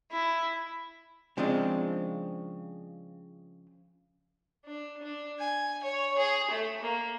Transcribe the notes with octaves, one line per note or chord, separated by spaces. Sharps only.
E4
C#3 F3 G#3 C4 D4
D4
D4
G#5
C#5
G#4
A3
A#3